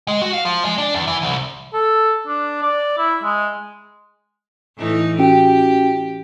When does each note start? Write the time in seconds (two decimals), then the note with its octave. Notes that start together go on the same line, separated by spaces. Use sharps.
0.08 G#3
0.22 F#4
0.33 F5
0.45 F3
0.65 G#3
0.78 D4
0.94 E2
1.07 E3
1.22 C2
1.73 A4
2.27 D4
2.62 D5
2.98 E4
3.24 G#3
4.77 A2 E3 D#4
5.19 C#4 F#4 G4 G5